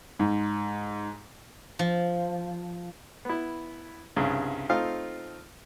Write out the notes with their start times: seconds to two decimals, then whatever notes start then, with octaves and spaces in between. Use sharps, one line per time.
0.19 G#2
1.79 F3
3.25 B3 E4
4.16 C2 G2 C#3
4.69 A3 C4 D#4 F4 F5